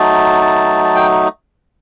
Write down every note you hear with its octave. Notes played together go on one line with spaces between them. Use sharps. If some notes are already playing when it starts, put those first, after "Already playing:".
Already playing: F#3 A3 D#4 A5
A5
A5
G5